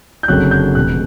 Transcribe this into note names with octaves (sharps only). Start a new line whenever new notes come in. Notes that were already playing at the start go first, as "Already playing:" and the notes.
G6
F#1 F2 D3 F#3 F#6
G6
F1 E2 B2 F#6